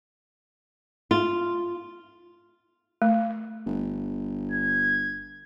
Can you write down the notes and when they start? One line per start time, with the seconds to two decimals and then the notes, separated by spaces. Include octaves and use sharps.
1.11 F4
3.02 A3
3.66 G1
4.52 G#6